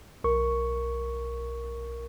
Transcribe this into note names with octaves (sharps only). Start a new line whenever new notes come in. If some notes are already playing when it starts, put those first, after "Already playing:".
B1 A#4 C#6